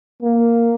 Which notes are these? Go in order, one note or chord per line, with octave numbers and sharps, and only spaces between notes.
A#3